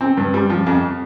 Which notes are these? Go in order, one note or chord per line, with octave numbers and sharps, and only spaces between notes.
C4
G2
G3
F3
F2